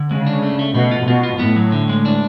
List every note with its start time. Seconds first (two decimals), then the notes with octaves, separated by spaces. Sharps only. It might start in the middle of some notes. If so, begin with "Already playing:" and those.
Already playing: D3
0.11 C#3 G#3
0.27 D4
0.43 A3
0.59 A3
0.74 B2 A3
0.91 F4
1.07 B2 F4
1.23 F4
1.39 A2 B3
1.56 F#3
1.72 D3
1.89 G#3
2.05 D4